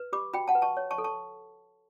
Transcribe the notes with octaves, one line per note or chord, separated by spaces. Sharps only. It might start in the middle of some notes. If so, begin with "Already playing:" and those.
Already playing: B4
G4 B5 D6
F#4 G5 B5
F#5 A5
B4
A5 C#6
C#5
A5 C#6
A4
A5 C#6